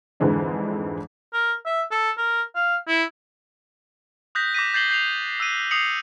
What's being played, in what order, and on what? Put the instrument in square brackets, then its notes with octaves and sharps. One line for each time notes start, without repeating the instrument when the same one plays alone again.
[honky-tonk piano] F2 G#2 D3 E3 G#3 D4
[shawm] A#4
E5
A4
A#4
F5
E4
[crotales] D#6 F#6 G6 A#6 B6
D6 A#6 B6 D#7
G6 A6 C7 F#7 G7
G6 C7 F7
E6 F#6 D#7
D#6 C7 C#7 F7 F#7